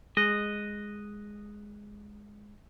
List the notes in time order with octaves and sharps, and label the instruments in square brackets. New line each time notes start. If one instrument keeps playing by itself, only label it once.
[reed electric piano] G#3 F#6 [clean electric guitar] D#5